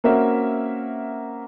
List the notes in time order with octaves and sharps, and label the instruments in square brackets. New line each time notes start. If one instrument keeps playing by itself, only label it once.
[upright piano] A#3 C4 C#4 F#4 A#4 E5